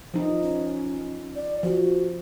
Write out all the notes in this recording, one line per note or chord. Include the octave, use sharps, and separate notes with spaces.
F3 D#4
C#4
D5
F3 F#4